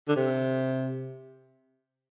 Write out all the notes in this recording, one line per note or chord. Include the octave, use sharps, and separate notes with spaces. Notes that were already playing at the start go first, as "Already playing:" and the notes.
D3
C3